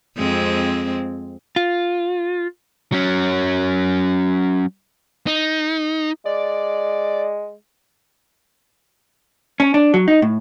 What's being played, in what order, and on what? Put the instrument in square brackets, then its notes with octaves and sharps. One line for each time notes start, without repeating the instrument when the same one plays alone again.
[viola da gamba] F2 G#3 C4
[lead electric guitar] F4
[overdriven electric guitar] F#3 C#4
[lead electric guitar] D#4
[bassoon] G#3 [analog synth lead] D5
[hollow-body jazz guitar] C#4
D4
F#3
D#4
A2